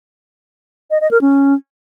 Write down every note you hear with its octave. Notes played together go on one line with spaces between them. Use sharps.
D#5
D#5
A#4
C#4